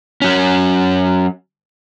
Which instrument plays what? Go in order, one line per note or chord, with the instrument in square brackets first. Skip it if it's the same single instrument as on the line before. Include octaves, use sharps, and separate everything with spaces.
[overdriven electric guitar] F#3 C#4